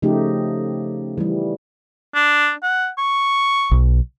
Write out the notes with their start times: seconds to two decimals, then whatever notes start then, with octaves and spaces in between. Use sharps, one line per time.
0.02 C#3 F3 A3 D#4 G4
1.18 E3 G3
2.15 D4
2.63 F#5
2.98 C#6
3.71 B1